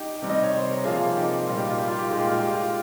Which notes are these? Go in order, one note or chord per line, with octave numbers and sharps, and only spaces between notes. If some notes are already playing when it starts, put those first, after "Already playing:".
Already playing: D#4 G4
C3 D#3 G3
D#5
C#5
C5
A#4
C3 F3 A#3 F4 G#4
D#4 G4
A#2 G3 A#3 D#4 F4
G4
F4
G4
F4
G4
A#2 G#3 D#4 F4
G4
F4
G4
F4